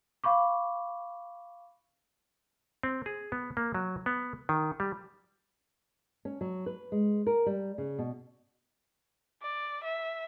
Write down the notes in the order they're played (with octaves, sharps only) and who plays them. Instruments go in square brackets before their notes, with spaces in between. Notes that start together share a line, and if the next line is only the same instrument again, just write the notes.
[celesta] F5 B5 C#6 D6
[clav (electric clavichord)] C4
G#4
B3
A#3
F#3
B3
D#3
G3
[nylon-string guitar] C#4
F#3
B4
G#3
A#4
G3
C#3
B2
[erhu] D5
E5